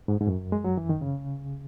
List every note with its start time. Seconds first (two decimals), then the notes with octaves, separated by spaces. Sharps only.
0.08 G#2
0.21 G#2
0.27 F#2
0.52 G#3
0.64 F#3
0.77 E3
0.89 D#3
1.01 C#3